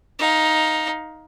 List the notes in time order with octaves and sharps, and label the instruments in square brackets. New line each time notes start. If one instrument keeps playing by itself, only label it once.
[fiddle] D#4 F5